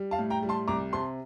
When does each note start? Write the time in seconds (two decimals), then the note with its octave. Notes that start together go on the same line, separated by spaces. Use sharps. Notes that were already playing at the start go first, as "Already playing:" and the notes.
Already playing: G3
0.11 F5 A5
0.19 A2
0.30 G5 A#5
0.43 G3
0.49 A5 C6
0.68 C2 A#5 D6
0.93 C3 A5 C6